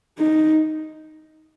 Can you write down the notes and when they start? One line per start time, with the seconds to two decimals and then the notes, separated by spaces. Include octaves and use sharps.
0.19 D#4